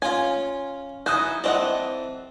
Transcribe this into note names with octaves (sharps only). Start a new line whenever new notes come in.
C#4 F4 G#5
D#4 E4 F#4 G#5 D#6 F#6 G6
E3 C4 A4 D5 D#5 F#5